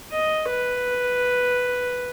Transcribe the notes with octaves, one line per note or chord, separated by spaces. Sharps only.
D#5
B4